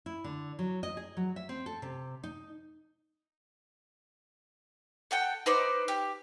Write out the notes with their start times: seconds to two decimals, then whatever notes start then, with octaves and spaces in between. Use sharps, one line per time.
0.06 E4
0.24 D3
0.59 F#3
0.83 D#5
0.97 G#4
1.17 F#3
1.36 E5
1.49 C4
1.66 A4
1.82 C3
2.24 D#4
5.11 A4 F#5 G5
5.46 D#4 B4 C5 D5
5.88 G4